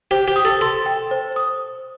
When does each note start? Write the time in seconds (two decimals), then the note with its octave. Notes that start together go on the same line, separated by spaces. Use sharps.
0.11 G4 C5
0.28 G4
0.36 D#6
0.45 A4
0.61 A4 C6
0.86 G5
1.11 C5
1.36 D#6